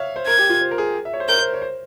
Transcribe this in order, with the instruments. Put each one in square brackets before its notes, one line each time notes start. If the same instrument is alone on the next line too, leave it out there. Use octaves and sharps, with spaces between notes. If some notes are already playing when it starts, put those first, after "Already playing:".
Already playing: [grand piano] C#5 E5 F5
C5
[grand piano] A#4 [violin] G#6
[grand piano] G4
F4
C5
A#4
G#4
E5
C#5
C5
[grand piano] A#4 [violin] G6
[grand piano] C5
C#5
C5